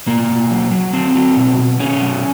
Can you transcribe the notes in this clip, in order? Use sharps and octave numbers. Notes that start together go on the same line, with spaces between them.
B2 A#3
B2
F#3
F#3
F#3 C4
F#3
B2
B2
B2 C#4
F#3